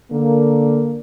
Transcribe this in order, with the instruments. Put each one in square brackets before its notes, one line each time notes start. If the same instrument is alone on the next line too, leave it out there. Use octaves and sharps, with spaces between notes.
[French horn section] D3 A#3